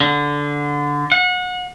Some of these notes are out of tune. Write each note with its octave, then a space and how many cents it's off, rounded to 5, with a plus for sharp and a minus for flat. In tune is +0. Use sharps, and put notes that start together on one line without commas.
D3 -10
F#5 -30